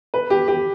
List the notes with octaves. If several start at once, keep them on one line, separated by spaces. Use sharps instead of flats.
B4
G4
G4